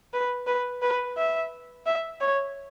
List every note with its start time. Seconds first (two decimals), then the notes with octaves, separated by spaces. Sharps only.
0.13 B4
0.47 B4
0.82 B4
1.17 E5
1.86 E5
2.20 C#5